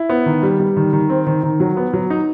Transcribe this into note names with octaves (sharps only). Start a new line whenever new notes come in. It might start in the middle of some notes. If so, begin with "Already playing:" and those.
Already playing: E4
B3
D#3
G3
G3
D#3
D#3
C4
D#3
D#3
F#3
B3
F#3
D#4